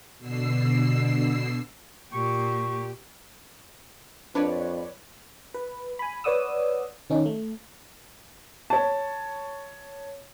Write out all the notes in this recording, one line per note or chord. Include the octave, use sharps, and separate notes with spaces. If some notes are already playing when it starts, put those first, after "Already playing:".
B2 D3 E6 C7
A#2 G4 C#6
F2 D4 B4 C#5 D5
B4
G#5 B5
B4 C#5 D5 F#5 D#6 E6
D#3 C#4 D#4
A3
C#5 A5